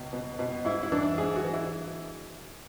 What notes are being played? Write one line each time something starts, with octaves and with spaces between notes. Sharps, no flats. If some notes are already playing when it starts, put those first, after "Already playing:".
Already playing: C#2 B2
B2
B2
G#2 E4
E4
E3 D4
G#2 G#4
F#4
E3
E4